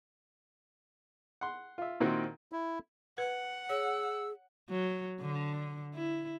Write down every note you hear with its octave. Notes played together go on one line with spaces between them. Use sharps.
F#5 C6
F4 E5
A#2 D#3 C4 E4 F#4
E4
B4 F#5
G#4 C#5 E6
F#3
D3
E4